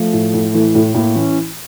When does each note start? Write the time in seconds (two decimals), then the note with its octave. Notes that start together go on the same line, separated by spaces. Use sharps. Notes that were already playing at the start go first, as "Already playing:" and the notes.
Already playing: F3 A3
0.13 A2
0.34 A2
0.54 E3
0.75 A2
0.95 A2 A#3
1.15 E3 C#4